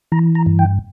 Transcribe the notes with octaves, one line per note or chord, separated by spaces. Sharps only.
E3 A#5
A#5
G2
G5